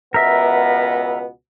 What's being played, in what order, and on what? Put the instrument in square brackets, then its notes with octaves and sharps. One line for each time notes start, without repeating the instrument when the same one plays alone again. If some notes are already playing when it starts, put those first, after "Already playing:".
[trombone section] C#2 B2 B3 [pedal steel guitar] A#4 E5